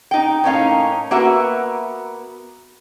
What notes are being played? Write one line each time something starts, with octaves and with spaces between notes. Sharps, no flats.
D#4 G5
A2 A#3 C#4 D#4 F5
A#3 B3 F#4 E5